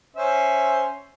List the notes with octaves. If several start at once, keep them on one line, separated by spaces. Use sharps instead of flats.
C#4 C5 E5